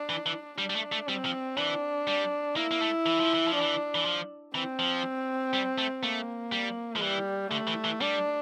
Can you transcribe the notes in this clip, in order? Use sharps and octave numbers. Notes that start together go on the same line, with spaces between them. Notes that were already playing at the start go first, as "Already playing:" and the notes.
Already playing: D4
E3
E3
G3 D4
G3
A3
A3
G3 C4
F3
E3 D4
G3
A#3 E4
A#3
A3
E3
F3
E3
F3
D4
E3
E3
F3
E3 C4
F3
G3
A3
A3 A#3
G3
F3
E3 G3
D3 A3
E3
E3
G3 D4